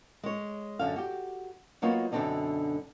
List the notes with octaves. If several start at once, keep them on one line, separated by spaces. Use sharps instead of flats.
G#3 C#5
F#2 D3 F5
F#4 G4
F#3 A#3 B3 D#4 F4 C#5
F#2 B2 D3 C4 D4 D#4